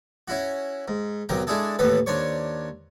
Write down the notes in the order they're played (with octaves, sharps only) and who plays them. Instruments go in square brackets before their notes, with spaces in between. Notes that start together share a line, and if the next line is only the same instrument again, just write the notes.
[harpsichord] C#4 E4 F#4
G#2
B1 C3 F#3 A#4 G5
G#3 D4 E4 G#4 A4
D#2 A2 E3 B3 A4 B4
D#2 D4 C5 C#5 C#6